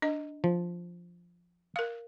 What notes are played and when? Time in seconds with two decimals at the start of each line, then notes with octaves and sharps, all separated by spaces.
0.02 D4 D#5
0.44 F3
1.76 A#4 F5